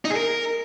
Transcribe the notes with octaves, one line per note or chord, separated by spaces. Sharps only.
D#4
G#4
A#4